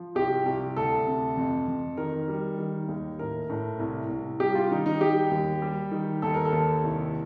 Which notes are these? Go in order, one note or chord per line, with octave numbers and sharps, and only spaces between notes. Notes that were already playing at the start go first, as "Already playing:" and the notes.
Already playing: F3
C2 G4
C2
D2 A4
C3
F2
F2
D#3 A#4
G3
D#3
D#2
A2 A#4
A2
C2
C2
G3 G4
F4
D#3 D#4
D#4
G3 G4
D#2
G3
D#3
D#2 A4
A#4
A4
D#2
C2